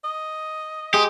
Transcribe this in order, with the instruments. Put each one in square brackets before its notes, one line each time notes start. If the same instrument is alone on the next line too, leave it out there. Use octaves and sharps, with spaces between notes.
[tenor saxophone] D#5
[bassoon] G#3 [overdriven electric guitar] G4 [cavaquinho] D#6